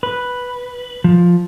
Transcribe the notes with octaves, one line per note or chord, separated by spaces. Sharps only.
B4
F3